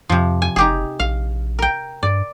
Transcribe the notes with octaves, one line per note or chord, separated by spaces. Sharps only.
F2 C3 F3
G#5
F#1 D#4 G4 G#4
A#1 F5
A#4 G5
G2 D5